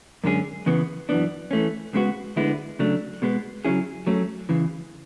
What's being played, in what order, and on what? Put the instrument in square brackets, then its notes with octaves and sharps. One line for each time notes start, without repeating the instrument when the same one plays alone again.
[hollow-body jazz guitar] F#2 D3 G#3 C#4 G#4
E2 C#3 E3 B3
F#2 E3 B3 D4
E3 A3 C#4
C#2 C#3 G#3 B3 F#4
D2 D3 G#3 B3 E4
C#3 F#3 A3 D4
B2 G#3 B3
C#3 F#3 C#4 E4 G#4
F#3 A3 C#4
E2 C#3 E3